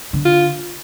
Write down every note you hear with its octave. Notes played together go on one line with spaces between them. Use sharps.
D3
F4